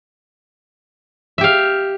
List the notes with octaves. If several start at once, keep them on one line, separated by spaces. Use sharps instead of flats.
G4 E5 F5